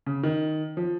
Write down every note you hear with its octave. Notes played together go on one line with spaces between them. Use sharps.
C#3
D#3
F3